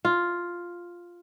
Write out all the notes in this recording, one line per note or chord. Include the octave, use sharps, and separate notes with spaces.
F4